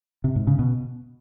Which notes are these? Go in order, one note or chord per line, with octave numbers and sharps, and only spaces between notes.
C3
G#2
C#3
B2